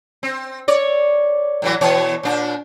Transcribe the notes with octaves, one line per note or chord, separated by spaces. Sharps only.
C4
C#5 D5
A2 E3 F#3
B2 E3 C#5
A#2 D4